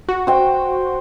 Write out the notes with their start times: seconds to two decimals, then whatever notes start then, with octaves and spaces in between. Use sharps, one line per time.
0.09 F#4
0.27 C5 G5